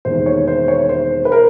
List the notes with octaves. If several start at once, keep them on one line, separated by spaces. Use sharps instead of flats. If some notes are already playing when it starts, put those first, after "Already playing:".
E1 D#2 D#3 C5
C#5
C5
C#5
C5
B4
A#4